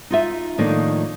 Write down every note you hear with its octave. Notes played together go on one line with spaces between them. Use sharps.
D#4 F4 E5
A2 D#3 F3 A#3 D4 D#4